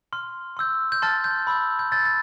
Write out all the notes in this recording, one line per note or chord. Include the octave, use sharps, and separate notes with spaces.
C6 F6
C6 E6 G6
G6
A5 C6 F6 A6
G6
B5 E6 G6
G6
C6 E6 G6 A6
A6